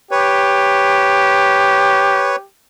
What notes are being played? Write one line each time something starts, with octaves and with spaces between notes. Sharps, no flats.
G4 B4 C#5